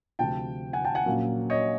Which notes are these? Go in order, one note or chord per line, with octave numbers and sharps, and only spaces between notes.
D2 C3 F3 G5 A5
F#5 G#5
G5 A5
F#5 G#5
A#1 A#2 F#3 A#3 C#4
C#5 D#5